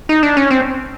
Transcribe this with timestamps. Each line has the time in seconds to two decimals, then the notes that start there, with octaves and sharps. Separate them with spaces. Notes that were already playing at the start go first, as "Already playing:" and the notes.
0.09 D#4
0.23 D4
0.37 C#4
0.51 C4